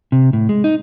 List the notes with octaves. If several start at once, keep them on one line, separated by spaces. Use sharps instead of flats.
C3
A2
G#3
D#4